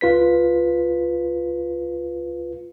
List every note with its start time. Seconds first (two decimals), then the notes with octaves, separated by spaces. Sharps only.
0.01 C#2 F4 B4 B6